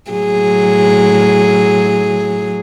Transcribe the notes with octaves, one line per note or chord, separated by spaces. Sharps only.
A2 F#3 G#4